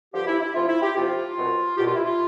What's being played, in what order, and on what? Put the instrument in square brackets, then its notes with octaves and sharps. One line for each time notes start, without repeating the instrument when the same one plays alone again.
[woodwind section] G2 D3 F3 G4
E4
E4
D2 C3 F3 F4
E4
G4
D2 C3 F3 F4
C2 B2
C2 B2 G4
F4
E4
F4